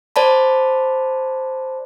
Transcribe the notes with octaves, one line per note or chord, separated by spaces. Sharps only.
C5 D5 A5 B5